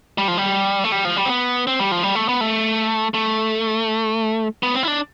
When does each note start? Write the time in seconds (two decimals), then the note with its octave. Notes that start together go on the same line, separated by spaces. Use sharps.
0.18 G3
0.28 F3
0.37 G3
0.84 A3
0.92 G3
1.05 F3
1.17 G3
1.26 C4
1.29 B3
1.67 C4
1.79 G3
1.91 F3
2.03 G3
2.15 A3
2.29 B3
2.41 A3
3.14 A3
4.63 B3
4.75 C4
4.83 E4
4.88 D4